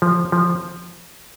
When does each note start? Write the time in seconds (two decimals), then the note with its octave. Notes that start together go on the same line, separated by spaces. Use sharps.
0.02 F3
0.32 F3